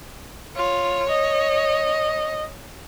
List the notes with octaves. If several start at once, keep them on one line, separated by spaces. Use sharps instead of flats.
F4 C#5
D#5